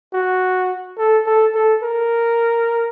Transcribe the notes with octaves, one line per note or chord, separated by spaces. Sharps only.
F#4
A4
A4
A4
A#4